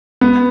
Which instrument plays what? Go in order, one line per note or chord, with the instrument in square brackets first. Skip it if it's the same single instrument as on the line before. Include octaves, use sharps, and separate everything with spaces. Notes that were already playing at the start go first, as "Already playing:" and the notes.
[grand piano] B3